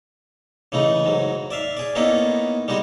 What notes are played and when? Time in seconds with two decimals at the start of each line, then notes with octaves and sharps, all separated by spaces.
0.72 C#3 E3 A3 D#4
1.05 G#2 F#3
1.51 D5 E5 F5
1.77 G#4 D5
1.95 A#3 B3 C#4 D#4 E4 A4
2.68 G3 G#3 D#4 F#4